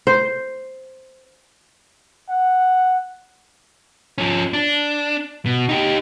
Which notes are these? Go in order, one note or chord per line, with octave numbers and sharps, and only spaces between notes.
C5
F#5
F3 C#4
D4
B2
D#4 G4